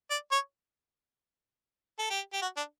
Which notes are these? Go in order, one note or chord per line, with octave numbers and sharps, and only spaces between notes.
D5
C#5
A4
G4
G4
F#4
D4